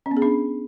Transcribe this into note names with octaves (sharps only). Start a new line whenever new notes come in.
C#4
B3
G#4
D4